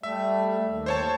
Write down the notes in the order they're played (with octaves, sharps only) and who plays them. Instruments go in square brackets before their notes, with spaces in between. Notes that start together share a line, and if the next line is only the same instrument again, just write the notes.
[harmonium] G3 A3 [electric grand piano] E5
[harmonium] D#2
[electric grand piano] C5 C#5 A5